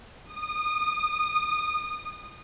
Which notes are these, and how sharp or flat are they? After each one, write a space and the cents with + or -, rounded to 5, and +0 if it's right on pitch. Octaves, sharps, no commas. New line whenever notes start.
D#6 -25